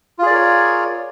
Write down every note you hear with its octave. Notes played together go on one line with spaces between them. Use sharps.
F4 G#4 A#4 C#5 D5